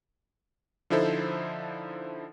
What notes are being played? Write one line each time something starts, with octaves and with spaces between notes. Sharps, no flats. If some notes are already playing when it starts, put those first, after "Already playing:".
D3 F3 D#4 E4 A4 C5